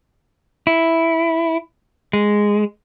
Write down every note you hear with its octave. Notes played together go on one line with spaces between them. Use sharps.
E4
G#3